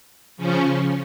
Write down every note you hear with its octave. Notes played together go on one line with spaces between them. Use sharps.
C#3 F3 C#4